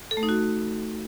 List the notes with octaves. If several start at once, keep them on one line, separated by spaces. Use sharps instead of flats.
A4
A3
D#4
F#4